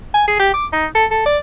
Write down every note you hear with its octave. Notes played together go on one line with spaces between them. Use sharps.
G#5
G#4
G4
D6
D#4
A4
A4
D5